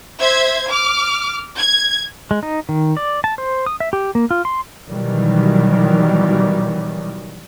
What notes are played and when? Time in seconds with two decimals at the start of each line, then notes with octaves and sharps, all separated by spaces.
0.20 C5 E5 G#6
0.69 D6 F6
1.59 G#6
2.31 G#3
2.43 D#4
2.69 D#3
2.97 D5
3.24 A5
3.38 C5
3.66 D#6
3.80 E5
3.93 G4
4.15 A#3
4.31 F4
4.45 C6
4.87 B2 D#3 E3 F#3 G3